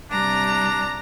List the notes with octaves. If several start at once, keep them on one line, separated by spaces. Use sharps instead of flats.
C3 G3 D4 A#5